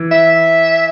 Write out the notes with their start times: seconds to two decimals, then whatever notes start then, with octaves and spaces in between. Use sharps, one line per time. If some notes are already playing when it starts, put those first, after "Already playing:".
Already playing: E3
0.11 E5